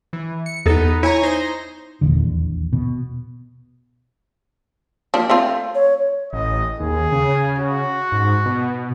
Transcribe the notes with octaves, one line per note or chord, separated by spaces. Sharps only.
E3
C#7
E2 B3 D#4 A4
E4 C#5 G#5 A#5
D#4 C5 A#6
D#1 A#1 E2 D3
B2
F3 A#3 D4
A3 C4 F4
C#5
A1 D#5
D#2 G#4
C#3
F#4
G#2
B2